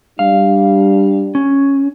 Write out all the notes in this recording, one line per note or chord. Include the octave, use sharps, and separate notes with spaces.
G3 D4 F5
C#4